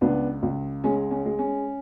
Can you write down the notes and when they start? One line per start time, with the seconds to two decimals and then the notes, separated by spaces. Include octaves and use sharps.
0.01 C#2 B3 D4
0.43 C#2
0.84 G#3 C#4
1.11 C#4
1.25 G#3
1.39 C#4